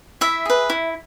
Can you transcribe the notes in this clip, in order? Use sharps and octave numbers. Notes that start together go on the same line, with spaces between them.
E4 E5
G#4 B4
E4